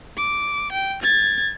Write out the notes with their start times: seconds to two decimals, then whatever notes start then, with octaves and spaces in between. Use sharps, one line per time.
0.17 D6
0.72 G5
1.02 G#6 A6